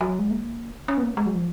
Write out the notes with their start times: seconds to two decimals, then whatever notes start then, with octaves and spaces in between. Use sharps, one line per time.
0.01 F#3
0.19 G#3
0.30 A#3
0.88 C#4
0.97 B3
1.02 A#3
1.17 G#3
1.26 F#3
1.35 F3